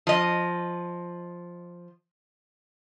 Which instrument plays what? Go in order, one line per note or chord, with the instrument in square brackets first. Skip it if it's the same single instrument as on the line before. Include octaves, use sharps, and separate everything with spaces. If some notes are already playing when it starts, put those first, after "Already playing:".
[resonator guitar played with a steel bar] F3 D#5